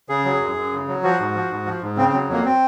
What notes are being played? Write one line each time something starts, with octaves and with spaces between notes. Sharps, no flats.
C#3 G#4
F#3
F#2
F#2
C#3
F#3
F3 F#4
G#2
F3
G#2
F3
G#2
C#3 C4
C4
F#3
F2 A#3
C4